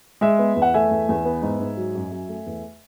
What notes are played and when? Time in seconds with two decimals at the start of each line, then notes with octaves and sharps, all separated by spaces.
0.21 G#3 E5
0.39 B3
0.56 E2
0.62 F#5
0.74 A3 E5 G#5
0.91 E2
1.09 E2
1.25 B3
1.42 G#2
1.60 G#2
1.77 F#3
1.95 F#2
2.12 F#2
2.29 A3
2.46 E2